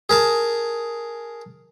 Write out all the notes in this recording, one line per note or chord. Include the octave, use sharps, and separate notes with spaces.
G#4 A#4 A5